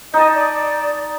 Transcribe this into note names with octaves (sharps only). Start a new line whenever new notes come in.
D#4 D#5 A5
D5